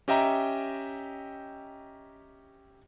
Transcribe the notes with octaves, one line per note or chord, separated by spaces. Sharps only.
C#4 G4 D#5 E5 G5 A#5